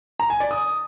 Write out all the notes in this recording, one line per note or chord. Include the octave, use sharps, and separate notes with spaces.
A#5
G#5
D5
D#6